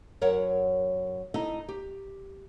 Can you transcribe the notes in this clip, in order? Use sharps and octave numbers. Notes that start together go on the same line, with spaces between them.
F#2 A#4 C#5 F#5
D#4 E4 A4 D#5
G4